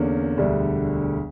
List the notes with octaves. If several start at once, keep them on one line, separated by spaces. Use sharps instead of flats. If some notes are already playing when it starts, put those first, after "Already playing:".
Already playing: E2 D3 A#3 C#4
E1 D2 D3 G3